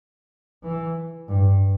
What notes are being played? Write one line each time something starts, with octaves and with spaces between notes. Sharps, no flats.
E3
G2